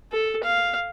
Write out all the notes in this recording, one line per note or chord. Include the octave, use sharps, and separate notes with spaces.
A4
F5